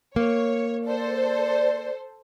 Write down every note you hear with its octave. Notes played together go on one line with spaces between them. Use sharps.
A#3 C#5
A4 C5 D5